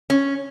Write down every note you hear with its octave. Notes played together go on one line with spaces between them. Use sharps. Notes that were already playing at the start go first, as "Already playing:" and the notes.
C#4